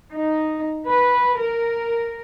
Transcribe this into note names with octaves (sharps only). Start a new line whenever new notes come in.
D#4
B4
A#4